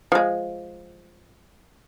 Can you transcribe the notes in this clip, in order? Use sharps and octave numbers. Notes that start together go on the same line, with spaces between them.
F3 G#3